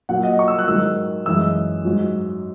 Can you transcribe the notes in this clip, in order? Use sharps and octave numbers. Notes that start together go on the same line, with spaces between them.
A#2 F#3 F#5
D#5
C#6
E6
F#6
G#2 D#3 F#3 E6
F#2 E3 G#3 E6
G#2 F#3